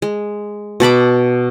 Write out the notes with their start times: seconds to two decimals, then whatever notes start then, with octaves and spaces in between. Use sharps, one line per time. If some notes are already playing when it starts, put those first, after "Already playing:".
0.02 G#3
0.80 B2 A5 B5 D6